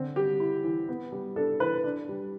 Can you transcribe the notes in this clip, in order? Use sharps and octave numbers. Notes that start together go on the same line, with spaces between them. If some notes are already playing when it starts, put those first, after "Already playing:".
Already playing: D3 C4
G3 G4
E4
E3
B3
G3
D4 A4
E3 B4
D4
G3